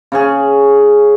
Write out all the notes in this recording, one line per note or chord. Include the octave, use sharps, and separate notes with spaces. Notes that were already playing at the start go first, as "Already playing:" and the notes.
C#3 C#4 G#4